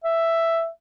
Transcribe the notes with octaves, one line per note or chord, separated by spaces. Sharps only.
E5